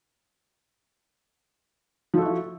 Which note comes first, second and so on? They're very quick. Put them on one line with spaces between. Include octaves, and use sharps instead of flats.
F3 A4 F#4 E4